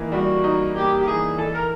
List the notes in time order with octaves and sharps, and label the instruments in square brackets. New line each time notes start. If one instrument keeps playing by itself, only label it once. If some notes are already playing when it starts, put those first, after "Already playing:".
Already playing: [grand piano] E3 A#3 D#4
[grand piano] G3 [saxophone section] F#4
[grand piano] D#4
[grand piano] A#3 [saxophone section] G4
[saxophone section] G4
[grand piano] E3 [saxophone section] G#4
[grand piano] E3 [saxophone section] A4
[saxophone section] A#4